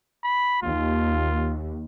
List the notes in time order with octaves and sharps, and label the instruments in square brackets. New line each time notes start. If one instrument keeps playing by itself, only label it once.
[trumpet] B5
[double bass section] D#2 [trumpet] F4